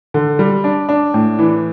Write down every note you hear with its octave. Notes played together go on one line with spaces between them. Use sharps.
D3
G3
D4
D4
A2
E3